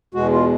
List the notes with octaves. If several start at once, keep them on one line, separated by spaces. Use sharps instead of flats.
E2 B2 G#3 F#4
F4